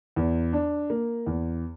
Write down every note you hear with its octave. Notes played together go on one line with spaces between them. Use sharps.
E2
D4
A#3
E2